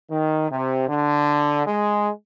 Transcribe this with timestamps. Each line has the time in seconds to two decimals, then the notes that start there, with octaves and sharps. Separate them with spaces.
0.10 D#3
0.50 C3
0.88 D3
1.67 G#3